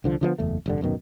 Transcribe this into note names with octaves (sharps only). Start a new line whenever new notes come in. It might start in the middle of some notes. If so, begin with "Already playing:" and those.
C2 D3 F3
D3 F3 G#3 B3
F#1 E2 A3
F1 G2 D3
D1 F#2 B2 D#3